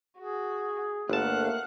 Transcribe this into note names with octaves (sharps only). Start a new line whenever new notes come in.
F#4 G#4
G1 A3 A#3 F5 F#5 A5 F#6